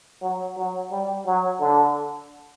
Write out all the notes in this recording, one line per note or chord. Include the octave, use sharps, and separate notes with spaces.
F#3
F#3
G3
F#3
D3